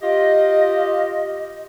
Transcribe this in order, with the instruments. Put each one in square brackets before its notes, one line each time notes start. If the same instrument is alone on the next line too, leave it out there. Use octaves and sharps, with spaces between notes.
[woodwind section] F4 G4 D#5